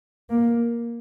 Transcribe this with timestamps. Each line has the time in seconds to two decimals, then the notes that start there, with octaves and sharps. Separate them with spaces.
0.30 A#3